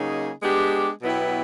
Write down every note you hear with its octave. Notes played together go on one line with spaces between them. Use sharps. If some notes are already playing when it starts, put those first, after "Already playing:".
Already playing: C#3 F#3 A#3 D#4 G#4
G#3 B3 D4 G4
B2 F#3 B3 E4 G4